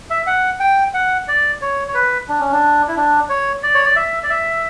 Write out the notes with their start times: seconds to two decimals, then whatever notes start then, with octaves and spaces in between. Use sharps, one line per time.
0.10 E5
0.27 F#5
0.60 G5
0.94 F#5
1.28 D5
1.62 C#5
1.88 C#5
1.94 B4
2.29 D4
2.40 C#4
2.52 D4
2.88 E4
2.96 D4
3.29 C#5
3.63 D5
3.74 C#5
3.85 D5
3.96 E5
4.23 D5
4.30 E5